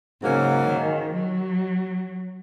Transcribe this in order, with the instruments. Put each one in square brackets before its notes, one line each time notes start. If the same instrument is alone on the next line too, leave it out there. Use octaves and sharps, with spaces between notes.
[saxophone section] G#2 F#3 A#3 C#4 [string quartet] C#3
[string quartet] D#3
F#3